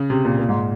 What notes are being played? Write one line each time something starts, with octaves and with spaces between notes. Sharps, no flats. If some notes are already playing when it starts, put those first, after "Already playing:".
Already playing: C#3
C3
A#2
A#2
G#2